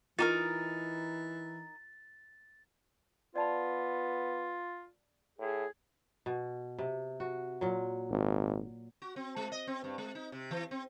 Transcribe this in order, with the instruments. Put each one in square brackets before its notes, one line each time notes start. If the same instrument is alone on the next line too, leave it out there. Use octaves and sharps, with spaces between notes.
[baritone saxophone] E3 [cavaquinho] D#4 G4 A#4 [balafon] F4 [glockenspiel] A6
[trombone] B3 [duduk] F4 [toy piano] D5 A5 B5
[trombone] A2 [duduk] G#4
[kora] B2
C3
F#4
A#2 F#3
[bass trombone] G#1
[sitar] F#4
C4
G#3
D#5
C4
G2
G#3
D#4
C3
E3
C4